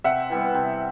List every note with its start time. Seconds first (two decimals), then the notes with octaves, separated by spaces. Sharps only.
0.04 C3 E5 F#5
0.30 E3 G3 B3
0.55 C3